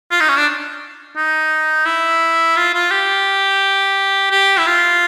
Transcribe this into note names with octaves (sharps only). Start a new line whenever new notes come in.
F4
D#4
C#4
D4
D#4
E4
F4
F4
G4
G4
E4
F4